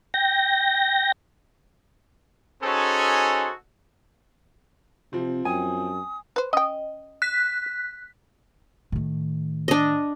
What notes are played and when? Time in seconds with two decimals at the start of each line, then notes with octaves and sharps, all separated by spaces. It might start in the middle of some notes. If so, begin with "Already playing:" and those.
0.14 G5 A#6
2.63 C#4 D#4 F#4 G#4 A4 C5
5.13 C3 F3 C4
5.45 F#2 G#5 D#6
6.36 B4 C5
6.53 C#4 D#5 G5
7.22 F#6 B6
8.92 A2 D#3
9.68 D4 D#5